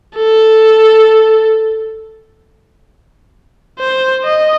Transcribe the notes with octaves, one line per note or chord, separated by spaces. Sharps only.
A4
C5
D#5